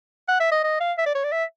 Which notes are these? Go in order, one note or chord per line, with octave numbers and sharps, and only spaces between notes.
F#5
E5
D#5
D#5
F5
E5
D5
C#5
D5
E5